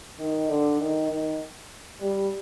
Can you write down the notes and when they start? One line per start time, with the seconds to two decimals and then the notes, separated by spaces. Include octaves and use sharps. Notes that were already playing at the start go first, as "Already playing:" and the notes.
0.19 D#3
0.48 D3
0.79 D#3
1.09 D#3
2.00 G3